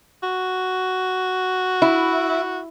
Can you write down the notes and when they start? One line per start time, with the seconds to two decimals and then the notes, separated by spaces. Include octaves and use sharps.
0.23 F#4
1.82 E4